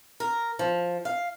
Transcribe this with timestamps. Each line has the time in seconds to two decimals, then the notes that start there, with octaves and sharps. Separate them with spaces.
0.20 A#4
0.59 F3
1.05 F5